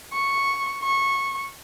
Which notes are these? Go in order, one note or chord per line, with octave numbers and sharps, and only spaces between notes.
C#6
C#6